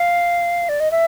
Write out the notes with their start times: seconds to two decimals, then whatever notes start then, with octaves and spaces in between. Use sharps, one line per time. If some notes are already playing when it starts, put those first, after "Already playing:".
Already playing: F5
0.69 D5
0.80 D#5
0.91 E5